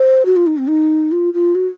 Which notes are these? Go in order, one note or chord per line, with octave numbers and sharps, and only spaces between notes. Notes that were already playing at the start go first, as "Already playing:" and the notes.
Already playing: C5
F#4
F4
D#4
C4
D#4
F4
F4
F#4